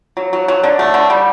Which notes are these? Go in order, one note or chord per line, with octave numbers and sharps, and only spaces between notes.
F#3
F#3
F#3
D3
A3
D3
G3